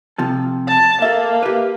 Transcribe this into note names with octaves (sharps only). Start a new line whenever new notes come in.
C3 F3 A4
A5
A#3 A4 E5
G4 B4